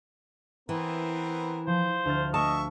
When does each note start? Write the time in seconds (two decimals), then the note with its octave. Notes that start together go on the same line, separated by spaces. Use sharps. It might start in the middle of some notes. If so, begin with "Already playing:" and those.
0.69 E3 B3 C4 A#4
1.67 F3 C5
2.05 D2 F6 A6
2.34 A3 D#5 E5 A5 C#6